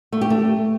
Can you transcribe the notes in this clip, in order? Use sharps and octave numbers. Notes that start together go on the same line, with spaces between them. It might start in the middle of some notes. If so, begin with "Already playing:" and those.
A3
G4
A3